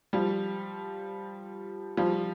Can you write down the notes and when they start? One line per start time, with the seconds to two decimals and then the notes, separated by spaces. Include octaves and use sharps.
0.13 F3 G3
1.97 F3 G3